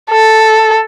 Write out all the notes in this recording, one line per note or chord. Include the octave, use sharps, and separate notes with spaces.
A4